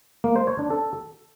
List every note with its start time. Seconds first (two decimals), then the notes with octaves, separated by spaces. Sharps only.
0.24 A#3
0.36 C5
0.47 C#5
0.59 D4
0.70 A4